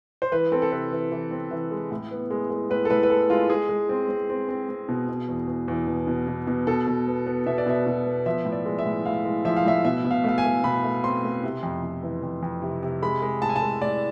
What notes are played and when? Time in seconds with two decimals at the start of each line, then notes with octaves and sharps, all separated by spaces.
0.22 C5
0.32 E3 B4
0.52 C4 A4
0.62 A4
0.72 C3 B4
0.92 E3
1.12 E3
1.31 C4
1.51 E3
1.71 G#3
1.91 A2
2.11 B3
2.30 G#3
2.50 G#3
2.70 A2 B4
2.85 A4
2.90 A2 B4
3.03 B4
3.10 G#3 A4
3.30 G#3 F4
3.50 G#3 G#4
3.69 G#3
3.89 C4
4.09 C4
4.30 C4
4.49 C4
4.69 C4
4.88 B2
5.09 B2
5.28 E2
5.47 E2
5.68 E2
5.88 B2
6.07 B2
6.27 B2
6.47 B2
6.67 B2 A4
6.87 B2
7.07 B3
7.27 B3
7.46 B2 E5
7.58 D5
7.66 B2 E5
7.86 B2
8.06 B3
8.26 F3 E5
8.45 A2
8.52 D5
8.65 G#3
8.79 E5
8.85 A2
9.05 A2 F5
9.25 G#3
9.45 F3 E5
9.56 F5
9.65 A2 E5
9.84 B2 E5
10.04 B2
10.11 F5
10.24 A3 F5
10.38 G#5
10.44 A3
10.64 B2 B5
10.84 A3
11.04 C4 C6
11.24 A3
11.44 C3
11.63 F2
11.84 F2
12.03 E3
12.23 F2
12.43 F2
12.62 C3
12.83 C3
13.02 G#3 B5
13.22 G#3
13.42 A2 A5
13.49 G#5
13.56 A5
13.62 G#3
13.81 A2 D5